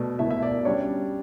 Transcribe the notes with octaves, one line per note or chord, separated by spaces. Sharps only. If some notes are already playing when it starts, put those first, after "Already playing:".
Already playing: B2 A3 D5
B2 A3 E4 E5
E5
D5
C#3 G3 D4 C#5